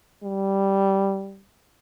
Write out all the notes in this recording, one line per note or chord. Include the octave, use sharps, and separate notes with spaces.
G3